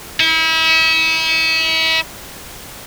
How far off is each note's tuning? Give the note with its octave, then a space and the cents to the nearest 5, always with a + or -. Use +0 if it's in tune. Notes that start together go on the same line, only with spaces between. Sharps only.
E4 -35